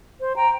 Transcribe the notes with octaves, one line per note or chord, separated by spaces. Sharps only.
C5
G5 A#5